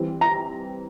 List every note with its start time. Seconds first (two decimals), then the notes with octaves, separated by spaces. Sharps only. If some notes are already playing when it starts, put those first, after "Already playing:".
Already playing: E3 G3 C4
0.21 A#5